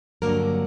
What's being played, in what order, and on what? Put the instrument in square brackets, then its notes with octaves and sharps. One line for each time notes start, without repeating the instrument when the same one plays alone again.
[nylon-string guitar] G2 D3 F#3 A#3 A#4